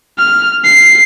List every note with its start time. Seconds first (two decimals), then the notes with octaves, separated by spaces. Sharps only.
0.18 F6
0.64 C7